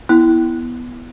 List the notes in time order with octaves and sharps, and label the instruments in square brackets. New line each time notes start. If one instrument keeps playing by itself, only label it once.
[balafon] B3 E4